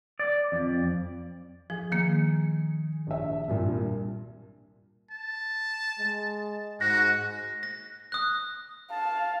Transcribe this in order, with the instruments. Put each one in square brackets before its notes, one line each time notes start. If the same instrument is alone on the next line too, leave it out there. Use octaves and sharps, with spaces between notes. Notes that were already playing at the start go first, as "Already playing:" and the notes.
[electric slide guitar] D5
F2
[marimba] F3 [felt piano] G#4
[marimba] D#3 A#3
[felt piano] A#1 E5
C2 G2 A#2
[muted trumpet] A5
[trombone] G#3
[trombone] G#2 [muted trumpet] F#4 [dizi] F#6 [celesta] A#6
[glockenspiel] A#6
D#6 F#6
[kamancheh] F5 [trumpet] A5